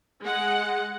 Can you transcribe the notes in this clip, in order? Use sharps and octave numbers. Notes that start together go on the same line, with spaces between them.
G#3 F#5